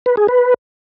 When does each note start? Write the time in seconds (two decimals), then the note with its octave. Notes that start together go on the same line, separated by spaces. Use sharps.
0.06 B4
0.17 G#4
0.28 B4